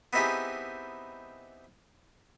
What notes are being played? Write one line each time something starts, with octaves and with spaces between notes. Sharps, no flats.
B3 C4 D#4 E4 G4 G#4